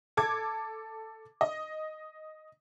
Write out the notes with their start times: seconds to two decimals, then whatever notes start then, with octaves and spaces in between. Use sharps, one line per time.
0.17 A4 D6 G#6
1.41 D#5